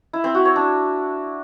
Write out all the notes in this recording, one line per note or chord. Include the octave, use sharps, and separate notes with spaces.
E4
C4
F#4
C#5
D4